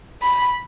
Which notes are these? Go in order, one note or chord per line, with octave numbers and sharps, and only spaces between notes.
B5